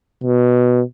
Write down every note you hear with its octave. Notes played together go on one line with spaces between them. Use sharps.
B2